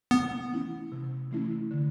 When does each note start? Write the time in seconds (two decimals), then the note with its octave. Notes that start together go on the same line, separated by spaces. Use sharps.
0.11 C3 B3
0.51 E3 A3 C#4 E4
0.92 C3
1.31 E3 A3 C#4 E4
1.71 D3